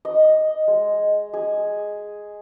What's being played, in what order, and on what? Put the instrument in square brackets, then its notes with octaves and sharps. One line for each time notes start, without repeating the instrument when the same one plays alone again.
[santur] D#5
G#3
G#4